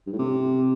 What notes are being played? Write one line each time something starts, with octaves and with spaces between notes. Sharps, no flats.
G2
A2
C3